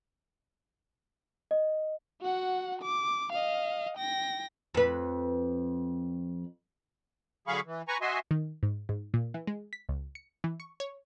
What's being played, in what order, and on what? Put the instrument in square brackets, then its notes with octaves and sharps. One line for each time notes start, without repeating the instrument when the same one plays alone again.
[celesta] D#5
[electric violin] F#4 F#5
D6
D#5 F5
G5 A#6
[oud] F2 B4
[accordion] D3 F#3 G#4 F5 B5 C#6
E3
B4 G#5 A#5 C#6
F#4 D#5 E5 G#5 C6
[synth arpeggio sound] D#3
G#2
G#2
A#2
E3
G#3
B6
C#2
C#7
E3
C#6
C#5